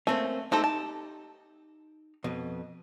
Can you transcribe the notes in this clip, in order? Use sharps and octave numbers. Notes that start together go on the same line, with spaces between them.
A3 A#3 C4 C#4
A3 C4 D#4 G4 A4
A5
F2 B2